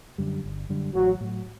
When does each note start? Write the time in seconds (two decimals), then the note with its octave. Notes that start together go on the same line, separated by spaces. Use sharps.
0.18 F#2 D3 G3
0.44 G1
0.69 F#2 D3 G3
0.95 A1 F#3
1.21 A2 F#3